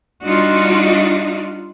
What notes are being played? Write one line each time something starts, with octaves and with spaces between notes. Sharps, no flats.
G3 D4 D#4 F4 F#4